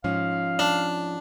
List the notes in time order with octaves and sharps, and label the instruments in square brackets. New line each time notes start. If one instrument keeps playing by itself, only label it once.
[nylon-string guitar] G#2 F3 C#4 [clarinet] F5
[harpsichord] D4